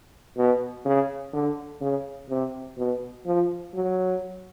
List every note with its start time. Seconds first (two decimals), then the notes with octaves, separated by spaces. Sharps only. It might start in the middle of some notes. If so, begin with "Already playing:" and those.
0.37 B2
0.85 C#3
1.34 D3
1.81 C#3
2.30 C3
2.78 B2
3.26 F3
3.74 F#3